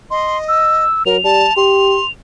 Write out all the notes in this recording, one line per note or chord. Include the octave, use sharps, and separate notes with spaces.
D#5 C6
E6
F#3 A#4 F7
G3 A5
G4 C6